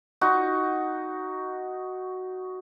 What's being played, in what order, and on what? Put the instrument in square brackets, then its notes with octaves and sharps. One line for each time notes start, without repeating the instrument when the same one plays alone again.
[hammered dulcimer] D#4 F#4